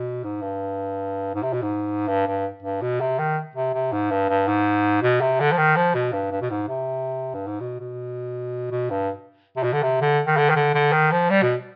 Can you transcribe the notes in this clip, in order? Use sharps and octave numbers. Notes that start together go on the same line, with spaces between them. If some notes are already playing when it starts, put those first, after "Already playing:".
Already playing: B2
G#2
G2
G#2
C3
B2
G#2
G2
G2
G2
B2
C3
D#3
C3
C3
G#2
G2
G2
G#2
B2
C3
D3
F3
D#3
F3
B2
G2
G2
B2
G#2
C3
G2
G#2
B2
B2
B2
G2
C3
B2
D3
C3
D3
D#3
D3
D#3
D3
D3
D#3
F3
G3
B2